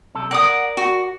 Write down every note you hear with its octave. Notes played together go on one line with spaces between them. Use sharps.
B1 C3 A4
A#4 D5 F#5 D#6
F#4